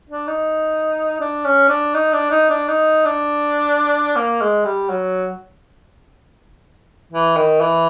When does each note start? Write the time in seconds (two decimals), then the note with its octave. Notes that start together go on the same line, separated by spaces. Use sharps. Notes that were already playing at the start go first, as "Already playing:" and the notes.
0.10 D4
0.28 D#4
1.20 D4
1.45 C#4
1.69 D4
1.94 D#4
2.13 D4
2.31 D#4
2.50 D4
2.68 D#4
3.05 D4
4.16 A#3
4.41 G#3
4.65 G3
4.90 F#3
7.12 E3
7.37 D#3
7.61 E3